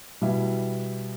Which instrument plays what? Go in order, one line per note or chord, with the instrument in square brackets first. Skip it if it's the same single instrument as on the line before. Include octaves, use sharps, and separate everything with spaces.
[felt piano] B2 G3 E4